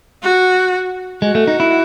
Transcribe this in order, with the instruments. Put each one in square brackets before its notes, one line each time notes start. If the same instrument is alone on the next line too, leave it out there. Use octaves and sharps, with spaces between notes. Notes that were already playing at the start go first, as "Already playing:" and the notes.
[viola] F#4
[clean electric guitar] G#3 [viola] F#4
[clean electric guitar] A3
D#4
E4